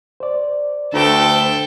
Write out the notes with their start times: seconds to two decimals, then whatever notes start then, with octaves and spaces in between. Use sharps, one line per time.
0.20 C5 D5
0.93 D2 D4 A4 B4 C5 G5